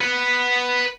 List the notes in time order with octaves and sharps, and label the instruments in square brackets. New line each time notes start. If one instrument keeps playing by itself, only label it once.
[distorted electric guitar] B4 F#5